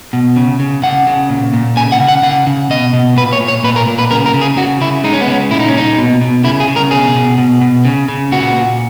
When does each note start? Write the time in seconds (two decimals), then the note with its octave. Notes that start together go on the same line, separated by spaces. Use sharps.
0.13 B2
0.36 C#3
0.60 C#3
0.83 C#3 F#5
1.07 C#3
1.30 A#2
1.54 A#2
1.77 C#3 G#5
1.92 F#5
2.00 C#3
2.08 F#5
2.23 C#3 F#5
2.47 C#3
2.70 B2 D#5
2.93 B2
3.16 A#2 B4
3.32 C#5
3.41 A#2
3.48 C#5
3.64 A#2 B4
3.76 A#4
3.87 A#2
3.98 B4
4.11 C#3 A#4
4.26 A#4
4.34 C#3
4.41 G#4
4.57 C#3 F#4
4.81 C#3 E4
5.04 G#3 D#4
5.13 C#4
5.21 B3
5.28 C#3 C#4
5.51 A#2 E4
5.60 D#4
5.68 C#4
5.74 A#2 D#4
5.98 B2
6.21 B2
6.44 C#3 E4
6.60 G#4
6.68 C#3
6.76 A#4
6.91 B2 G#4
7.15 B2
7.38 B2
7.61 B2
7.85 C#3
8.08 C#3
8.32 A#2 F#4
8.55 A#2